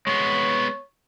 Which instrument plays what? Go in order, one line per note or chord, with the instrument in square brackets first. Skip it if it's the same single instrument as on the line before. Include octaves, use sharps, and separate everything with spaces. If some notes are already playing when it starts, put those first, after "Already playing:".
[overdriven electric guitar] G#3 B3 [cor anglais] C#5